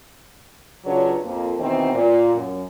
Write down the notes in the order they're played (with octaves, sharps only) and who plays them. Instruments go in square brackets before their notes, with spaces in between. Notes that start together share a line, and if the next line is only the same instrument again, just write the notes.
[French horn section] C#3 F#3 D4 F4 B4 C#5
F2 A#3
B2 D#3 E3 B3 C4
A#2
F#2